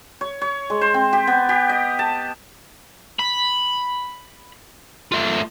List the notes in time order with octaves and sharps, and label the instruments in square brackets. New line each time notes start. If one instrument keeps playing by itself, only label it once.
[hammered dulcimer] C#5
C#5
G#3
C5
C4
G4
B3
G4
D#5
A5
[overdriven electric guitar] B5
A3 F4